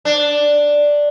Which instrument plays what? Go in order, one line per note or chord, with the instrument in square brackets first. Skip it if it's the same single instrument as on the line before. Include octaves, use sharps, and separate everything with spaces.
[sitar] D4